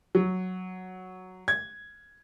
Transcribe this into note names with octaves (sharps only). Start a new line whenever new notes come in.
F#3
G#6